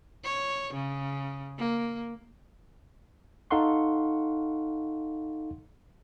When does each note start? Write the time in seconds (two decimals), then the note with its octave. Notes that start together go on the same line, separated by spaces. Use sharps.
0.24 C#5
0.73 C#3
1.58 A#3
3.51 D#4 A4 F5 F#5 C6 C#6